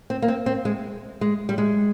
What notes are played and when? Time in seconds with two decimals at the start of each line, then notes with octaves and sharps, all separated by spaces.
0.10 C4
0.22 A#3
0.28 C4
0.46 C4
0.65 G#3
1.21 G#3
1.49 G3
1.58 G#3